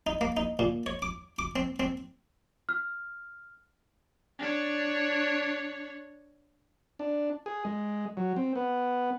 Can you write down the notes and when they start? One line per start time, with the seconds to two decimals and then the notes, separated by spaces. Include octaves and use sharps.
0.07 D#4
0.21 A#3
0.37 D#4
0.59 A#2
0.86 C#5
1.02 D6
1.39 D6
1.56 C4
1.80 C4
2.69 F6
4.39 D4 C#5
6.99 D4
7.46 G#4
7.65 G#3
8.17 F#3
8.36 C4
8.56 B3